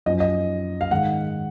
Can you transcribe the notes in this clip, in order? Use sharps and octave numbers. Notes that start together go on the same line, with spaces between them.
F#2 F3 D#5
D#5
F5
G#2 D#3 F#5